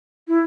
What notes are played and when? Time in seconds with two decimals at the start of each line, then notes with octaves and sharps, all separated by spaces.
0.28 E4